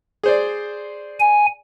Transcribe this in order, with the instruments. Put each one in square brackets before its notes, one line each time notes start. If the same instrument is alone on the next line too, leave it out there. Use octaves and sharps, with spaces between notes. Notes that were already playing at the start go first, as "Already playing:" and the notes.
[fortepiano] G#4 C5 D5
[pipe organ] G#5